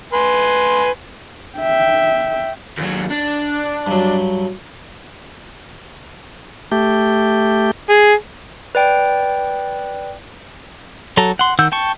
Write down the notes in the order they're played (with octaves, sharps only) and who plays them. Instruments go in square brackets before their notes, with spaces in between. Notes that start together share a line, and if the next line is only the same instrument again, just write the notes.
[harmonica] B4 G#5 C6
[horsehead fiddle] E5 G5
[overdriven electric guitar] D#2 F#3
D4
[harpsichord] G2 F#3
[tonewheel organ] A3 G4
[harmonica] G#4
[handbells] B4 D5 G5
[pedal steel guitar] F#3 A4 A#5
F#5 C6
D#3 F#5 E6 G6
G5 A5 C#6